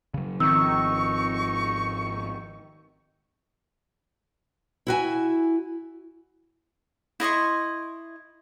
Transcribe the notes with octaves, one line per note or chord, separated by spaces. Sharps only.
C#3 F#3
G#1 D#3 F3 C4 D#4 C#6 E6
E4 F#4 G#5
E4 D#5 C6 C#6